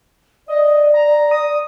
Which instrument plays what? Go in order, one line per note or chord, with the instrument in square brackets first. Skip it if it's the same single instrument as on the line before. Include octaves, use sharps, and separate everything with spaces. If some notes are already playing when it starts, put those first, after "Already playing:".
[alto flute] D5 [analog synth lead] D#5
[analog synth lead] A#5
D#6